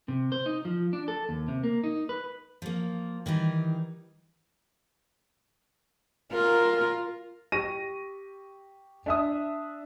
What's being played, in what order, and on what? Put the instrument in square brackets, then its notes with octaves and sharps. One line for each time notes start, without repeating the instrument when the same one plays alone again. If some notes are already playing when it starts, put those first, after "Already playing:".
[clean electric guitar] C3
C5
D#4
F3
D4
A4
D#2
C3
A#3
D#4
B4
[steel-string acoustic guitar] F3 A#3
D#3 E3 G3 D#4
[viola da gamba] F4 [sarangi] A#4
[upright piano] G4 C#6 A#6 D#7
D4 E5 D#6